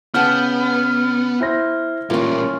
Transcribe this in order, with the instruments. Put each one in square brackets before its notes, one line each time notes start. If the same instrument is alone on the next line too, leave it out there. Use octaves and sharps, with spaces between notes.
[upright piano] C#3 [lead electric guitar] B3 [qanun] F#5 G5 A5 [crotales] F6
[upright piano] E4 C5 A#6
[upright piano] A1 A#3 [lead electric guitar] A#2 G3 [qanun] C#4 F4